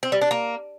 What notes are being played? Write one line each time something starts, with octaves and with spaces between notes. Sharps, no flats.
C4
G3
D4
A#3